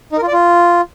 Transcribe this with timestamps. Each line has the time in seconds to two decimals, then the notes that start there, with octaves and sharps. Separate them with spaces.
0.12 D#4
0.17 A#4
0.22 F4
0.28 D5
0.33 F4